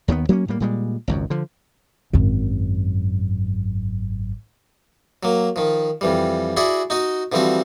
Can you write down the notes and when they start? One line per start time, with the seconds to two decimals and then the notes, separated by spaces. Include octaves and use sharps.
0.08 D#2 D#3 F#3 B3
0.29 F#3 A#3 B3 C#4
0.48 A2 G3 A#3
0.60 A#2 G3 G#3
1.08 G#1 C#2 F#2
1.30 D3 F3
2.13 G#1 F#2
5.23 F#3 A#3
5.56 D#3 F3
6.01 F2 E3 G3
6.57 E4 F#4 G#4 D5 F#5
6.90 D#4 F#4 D#5
7.32 D3 E3 F3 G3 C4 F#4